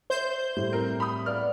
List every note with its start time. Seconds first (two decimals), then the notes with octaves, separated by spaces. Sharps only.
0.10 C5 E5 G6
0.56 A2 G3
0.72 C4 A#4
1.00 B5 D#6
1.26 B3 D5 F5 F6